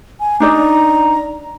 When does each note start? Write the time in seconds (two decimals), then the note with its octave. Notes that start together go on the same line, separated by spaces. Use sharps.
0.20 G#5
0.40 D4 D#4 D5 A#5